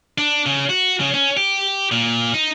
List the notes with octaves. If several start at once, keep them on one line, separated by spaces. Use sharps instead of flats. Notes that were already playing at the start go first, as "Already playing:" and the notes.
D4
C#3
F#4
C#3
C#4
G4
A#2
D#4